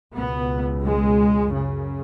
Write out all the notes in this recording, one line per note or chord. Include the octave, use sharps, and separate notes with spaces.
C#2 B2 B3
G#3
F#2 C#3